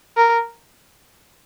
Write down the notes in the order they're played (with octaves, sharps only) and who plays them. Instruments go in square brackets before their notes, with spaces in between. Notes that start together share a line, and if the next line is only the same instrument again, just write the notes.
[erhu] A#4